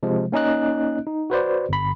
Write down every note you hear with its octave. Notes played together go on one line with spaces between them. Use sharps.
C3 F3 G#3
A#3 C#4 D#4 D#5 F#6
D#4
F#4 B4 C5 D5
G1 B5